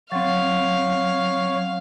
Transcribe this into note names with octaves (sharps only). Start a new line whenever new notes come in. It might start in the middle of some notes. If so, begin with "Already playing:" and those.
F#3 C4 C#5 F5